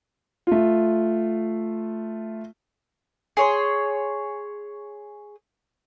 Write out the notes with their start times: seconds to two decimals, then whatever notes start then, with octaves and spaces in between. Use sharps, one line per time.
0.47 A3 F4
3.37 G#4 C#5 C6